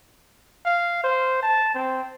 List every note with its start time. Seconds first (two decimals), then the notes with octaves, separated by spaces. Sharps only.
0.66 F5
1.04 C5
1.43 A5
1.75 C4